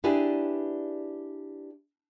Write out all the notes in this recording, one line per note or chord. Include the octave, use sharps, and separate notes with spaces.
D4 E4 G4 G#4 B4 D5